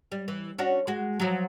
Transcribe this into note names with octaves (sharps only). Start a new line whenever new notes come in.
G3
E3
C#4 D4 F#4
G#3 F#4
F3 F#3